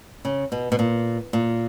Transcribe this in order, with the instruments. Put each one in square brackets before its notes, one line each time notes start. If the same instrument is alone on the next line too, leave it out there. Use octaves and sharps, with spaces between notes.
[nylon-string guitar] C#3
B2
B2
A#2
A#2